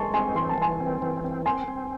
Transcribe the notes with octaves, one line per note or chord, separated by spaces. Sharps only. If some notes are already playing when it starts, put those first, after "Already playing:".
Already playing: G#3 G#5 A5 C6 C#6
C4 G#5 C6
E3 C6
A5
E3 G#5 C6
C4
E3
C4
C4 G#5 C6
C4